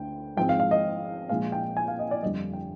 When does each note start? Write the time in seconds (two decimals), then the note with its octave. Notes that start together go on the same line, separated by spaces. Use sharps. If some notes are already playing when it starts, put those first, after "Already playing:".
Already playing: D2 D3 G5
0.37 G#1 G#2 F3 G#3 C4 G5
0.49 F5
0.60 F5
0.71 D#5
1.29 A#1 A#2 G#3 F5
1.52 G5
1.77 G#5
1.88 F5
1.99 D#5
2.11 D5
2.22 G1 F2 D3 G3 D#5
2.53 G5